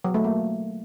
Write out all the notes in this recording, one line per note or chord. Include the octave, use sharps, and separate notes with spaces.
F#3
A3
A#3